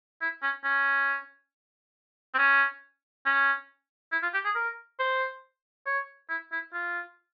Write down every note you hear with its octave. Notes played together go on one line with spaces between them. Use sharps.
E4
C#4
C#4
C4
C#4
C#4
E4
F4
G4
G#4
A#4
C5
C#5
E4
E4
F4